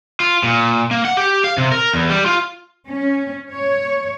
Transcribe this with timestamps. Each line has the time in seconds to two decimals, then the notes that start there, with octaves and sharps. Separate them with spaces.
0.20 F4
0.43 A#2
0.91 A#3
1.05 F#5
1.17 G4
1.44 F5
1.58 C3
1.72 A#4
1.93 E2
2.10 G3
2.26 F4
2.89 C#4
3.52 C#5